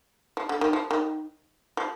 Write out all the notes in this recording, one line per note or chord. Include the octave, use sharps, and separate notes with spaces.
F3
D3
D#3
F3
D#3
F3